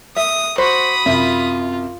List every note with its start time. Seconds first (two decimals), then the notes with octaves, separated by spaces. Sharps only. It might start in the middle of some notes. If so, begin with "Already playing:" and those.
0.16 E5 D#6
0.58 F#4 C5 B5 D#6
1.06 F#2 C3 F4 E5